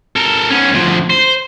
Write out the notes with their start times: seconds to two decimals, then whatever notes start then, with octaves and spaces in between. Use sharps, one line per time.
0.16 A4 A#4
0.50 B3 C#4
0.72 D2 F3
1.10 C5